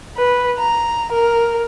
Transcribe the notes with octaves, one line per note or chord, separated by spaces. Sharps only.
B4
A#5
A#4